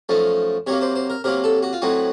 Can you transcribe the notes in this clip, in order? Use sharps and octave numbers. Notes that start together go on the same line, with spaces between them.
F#2 F3 A3 D#4
C3 F#3 A#3 C#5
C5
C5
A#4
C3 F#3 A#3 A#4
A4
F#4
F4
A2 F#3 C4 D#4 F#4